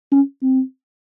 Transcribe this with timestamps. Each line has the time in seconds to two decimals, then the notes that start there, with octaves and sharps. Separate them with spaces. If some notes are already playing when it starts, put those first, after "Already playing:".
0.12 C#4
0.43 C4